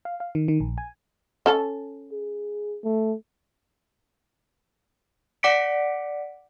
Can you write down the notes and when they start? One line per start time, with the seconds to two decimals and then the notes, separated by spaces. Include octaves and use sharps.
0.05 F5
0.20 F5
0.35 D#3
0.48 D#3
0.60 A#1
0.78 G#5
1.46 C#4 A4 A5
2.12 G#4
2.83 A3
5.43 D5 F#5 D6 B6 C#7 D7